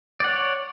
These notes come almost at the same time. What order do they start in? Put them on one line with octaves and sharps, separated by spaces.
D5 F#5 C#5